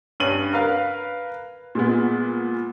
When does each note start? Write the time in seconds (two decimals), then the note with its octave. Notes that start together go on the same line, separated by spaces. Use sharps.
0.20 G2 C#4 D#7 F#7
0.53 A#4 B4 F5
1.75 A#2 G#3 B3